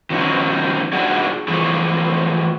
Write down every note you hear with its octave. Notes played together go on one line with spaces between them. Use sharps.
D#3 F3 F#3 C#4 D#4
D4 D#4 F#4 G#4 D5
E3 F3 A3 G#4